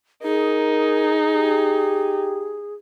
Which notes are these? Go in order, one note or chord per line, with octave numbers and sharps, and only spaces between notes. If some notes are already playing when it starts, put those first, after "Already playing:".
D#4 G#4 A#4
G4